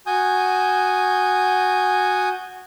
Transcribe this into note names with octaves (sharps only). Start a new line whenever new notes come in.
F#4 G#5 D#6 G6